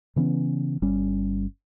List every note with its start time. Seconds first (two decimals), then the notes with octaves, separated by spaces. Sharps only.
0.16 C#3 E3 B3 C#4
0.82 G1 G3 C#4